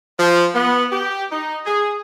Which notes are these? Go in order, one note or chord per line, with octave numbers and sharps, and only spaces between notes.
F3
B3
G4
D#4
G#4